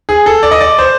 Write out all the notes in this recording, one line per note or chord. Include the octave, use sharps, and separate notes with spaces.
G#4
A4
D5
D#5
D5
C5